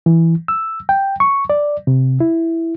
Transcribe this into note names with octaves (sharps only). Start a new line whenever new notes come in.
E3
E6
G5
C#6
D5
C3
E4